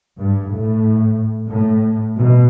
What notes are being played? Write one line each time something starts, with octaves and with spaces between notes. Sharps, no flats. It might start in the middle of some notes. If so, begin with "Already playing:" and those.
G2
A2
A2
B2